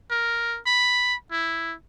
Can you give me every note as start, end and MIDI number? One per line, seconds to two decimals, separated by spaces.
0.10 0.58 70
0.66 1.14 83
1.32 1.73 64